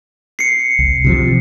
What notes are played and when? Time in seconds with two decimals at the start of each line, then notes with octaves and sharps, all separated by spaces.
0.39 C7 C#7
0.79 C2
1.04 C3 D#3 F3